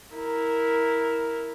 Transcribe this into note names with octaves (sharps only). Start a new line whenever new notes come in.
E4 A#4